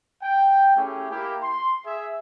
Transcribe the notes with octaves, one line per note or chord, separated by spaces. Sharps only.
G5
A3 C#4 E4 G4 G#4
A#3 E4 G4
C6
G#4 E5